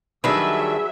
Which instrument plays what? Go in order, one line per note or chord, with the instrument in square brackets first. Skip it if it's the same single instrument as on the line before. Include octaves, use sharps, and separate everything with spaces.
[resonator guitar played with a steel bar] D#3 G3 D4 [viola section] F#3 E5 [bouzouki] G#4 B4